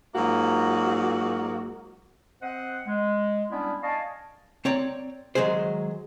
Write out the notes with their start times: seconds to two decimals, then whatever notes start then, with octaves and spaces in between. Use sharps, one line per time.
0.15 G#2 F#3 A#3 F4 F#4
2.42 C4 C5 D#5 F#5
2.86 G#3
3.51 G3 B3 C#4 D4 E4 D5
3.83 D5 D#5 F5 G#5 A5 C#6
4.65 C4 C#5 D5 A#5
5.35 D#3 F#3 G#3 G#4 C5